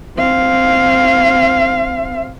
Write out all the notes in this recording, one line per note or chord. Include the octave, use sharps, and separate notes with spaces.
C4 F5